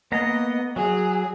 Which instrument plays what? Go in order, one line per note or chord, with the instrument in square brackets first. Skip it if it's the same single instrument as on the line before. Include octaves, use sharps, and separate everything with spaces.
[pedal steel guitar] A#3 B3 A#5 [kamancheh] D#5
[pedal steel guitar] F#3 [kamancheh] G#4